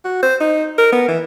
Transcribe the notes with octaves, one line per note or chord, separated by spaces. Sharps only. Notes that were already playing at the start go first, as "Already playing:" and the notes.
F#4
C5
D#4
A#4
B3
E3